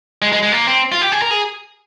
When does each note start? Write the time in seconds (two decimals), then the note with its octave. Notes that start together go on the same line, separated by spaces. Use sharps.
0.22 G#3
0.32 G#3
0.43 G#3
0.52 A#3
0.67 C4
0.92 F4
1.01 G4
1.12 G#4
1.22 A#4
1.31 G#4